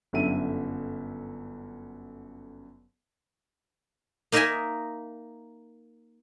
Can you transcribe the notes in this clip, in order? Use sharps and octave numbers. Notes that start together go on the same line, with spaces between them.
G1 F#2 D3 E5 D#7
A#3 D#4 A#4 D#5 E5 G#5